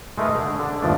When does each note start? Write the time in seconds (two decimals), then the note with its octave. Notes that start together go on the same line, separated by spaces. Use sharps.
0.18 G#3 A3 D#4 A#4 B4
0.35 D3 G#4
0.59 D3 D4
0.82 G1 D#2 F3 A3 D4